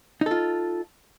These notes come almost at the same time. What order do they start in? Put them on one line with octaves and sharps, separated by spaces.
D#4 A4 F4